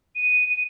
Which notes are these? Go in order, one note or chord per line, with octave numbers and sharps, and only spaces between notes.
D#7